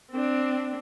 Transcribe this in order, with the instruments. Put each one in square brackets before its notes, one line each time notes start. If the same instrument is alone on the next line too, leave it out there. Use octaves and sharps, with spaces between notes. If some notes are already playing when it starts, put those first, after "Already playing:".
[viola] C4 D4